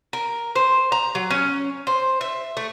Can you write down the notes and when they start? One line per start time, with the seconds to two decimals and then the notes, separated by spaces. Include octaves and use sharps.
0.13 A#4
0.56 C5
0.92 A#5
1.15 F#3
1.31 C#4
1.87 C5
2.21 E5
2.57 A3